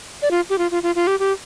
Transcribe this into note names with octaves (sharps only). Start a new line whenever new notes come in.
D5
F4
G4
F4
F4
F4
F4
G4
G4